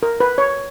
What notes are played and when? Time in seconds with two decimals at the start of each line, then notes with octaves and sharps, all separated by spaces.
0.03 A#4
0.20 B4
0.38 C#5